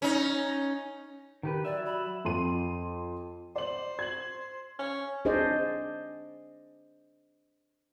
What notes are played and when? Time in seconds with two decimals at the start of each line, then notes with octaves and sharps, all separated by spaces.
0.02 C#4 D#4
1.43 D#3 G4 B4
1.65 F#3 D5 E5
1.86 B5
2.25 F2 C6 D#7
3.56 C5 D5 F#7
3.99 G#6 F#7
4.79 C#4
5.25 D4 G#4 C5 D5 D#5